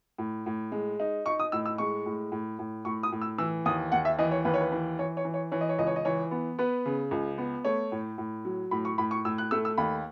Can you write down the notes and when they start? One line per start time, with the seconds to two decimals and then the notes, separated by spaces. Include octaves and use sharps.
0.18 A2
0.46 A2
0.72 G#3
1.00 D#4
1.26 D#4 C#6
1.39 D#6
1.52 A2 E6
1.66 E6
1.78 G#3 C#6
2.06 A2
2.32 A2
2.59 A2
2.85 A2 C#6
3.03 D#6
3.12 A2
3.22 E6
3.38 E3 E6
3.65 D#2 D#6
3.92 D#2 F#5
4.05 E5
4.18 E3 D#5
4.31 C#5
4.45 D#2 B4
4.54 C#5
4.61 B4
4.72 E3
4.99 E3 C#5
5.17 C#5
5.25 E3
5.34 C#5
5.52 E3 C#5
5.61 D#5
5.69 C#5
5.78 C#2 D#5
5.87 C#5
5.96 D#5
6.05 E3 C#5
6.31 B3
6.59 B3 B4
6.86 C#3
7.11 C#2
7.38 B3
7.65 A3 C#5
7.92 A2
8.18 A2
8.45 F#3
8.71 A2 B5
8.85 C#6
8.98 A2 B5
9.11 C#6
9.25 A2 E6
9.38 F#6
9.51 A3 E6
9.65 E6
9.78 D#2 B5